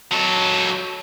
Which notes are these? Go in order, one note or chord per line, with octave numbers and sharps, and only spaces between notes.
F#3 A4